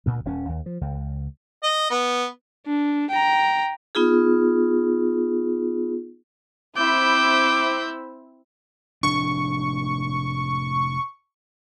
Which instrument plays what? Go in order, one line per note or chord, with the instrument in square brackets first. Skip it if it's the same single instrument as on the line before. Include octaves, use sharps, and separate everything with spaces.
[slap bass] D2 A#2
D#1 C#4
D#2
F3
C#2
[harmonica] D#5
B3
[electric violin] D4
G5 A#5
[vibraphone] B3 D#4 F4 G#4
[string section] C4 E4 C5 [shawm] D6 [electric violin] E6 G6
[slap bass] F1 A2 D4 [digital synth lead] C#6